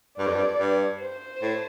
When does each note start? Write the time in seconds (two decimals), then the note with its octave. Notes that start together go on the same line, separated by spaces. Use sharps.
0.18 G2 D5
0.27 F2
0.35 G2
0.59 G2
1.00 C5
1.42 A2